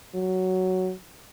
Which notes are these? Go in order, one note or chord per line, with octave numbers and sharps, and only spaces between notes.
F#3